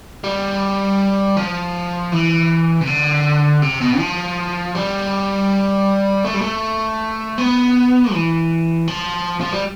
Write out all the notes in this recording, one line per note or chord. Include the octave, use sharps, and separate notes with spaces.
G3
F3
E3
C3
D3
C3
B2
F3
G3
A3
G3
A3
B3
E3
F3
F3
G3